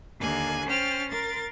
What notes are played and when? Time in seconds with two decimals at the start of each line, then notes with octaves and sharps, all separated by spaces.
0.19 D#2 D3 A#3 G#5 F#6
0.68 C#4 C5 G5 F6 A6
1.09 A#4 C6 A6